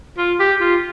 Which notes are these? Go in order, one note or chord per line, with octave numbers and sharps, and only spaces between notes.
F4
G4
F4